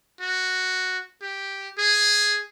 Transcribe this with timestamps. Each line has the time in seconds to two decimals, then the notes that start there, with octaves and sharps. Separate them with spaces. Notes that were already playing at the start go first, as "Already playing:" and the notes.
0.21 F#4
1.22 G4
1.78 G#4